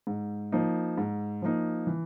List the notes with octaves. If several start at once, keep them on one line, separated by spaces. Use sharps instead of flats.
G#2
F3 A#3 D#4
G#2
F3 A#3 D#4
E3